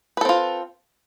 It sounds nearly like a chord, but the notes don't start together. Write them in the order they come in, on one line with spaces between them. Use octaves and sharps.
B4 A4 C4 F4